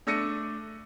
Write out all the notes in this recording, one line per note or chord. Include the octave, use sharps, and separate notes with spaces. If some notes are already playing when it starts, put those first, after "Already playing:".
A3 D4 E6 A#6 C#7 D#7